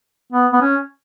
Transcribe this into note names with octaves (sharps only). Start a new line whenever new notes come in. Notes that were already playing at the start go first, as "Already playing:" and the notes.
B3
B3
C#4